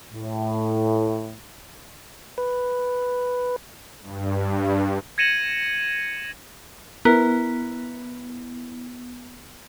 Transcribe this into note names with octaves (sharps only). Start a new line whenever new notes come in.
A2
B4
G2
G#6 A#6 C#7 D#7 E7 F#7
B3 E4 A#4 B4